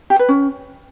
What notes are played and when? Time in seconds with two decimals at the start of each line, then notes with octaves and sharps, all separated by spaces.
0.10 G4
0.19 B4
0.29 C#4